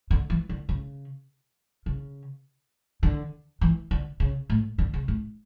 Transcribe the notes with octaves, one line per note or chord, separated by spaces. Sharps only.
D3
E3
D3
C#3
C#3
D3
E3
D3
C#3
A2
D3
C#3
A2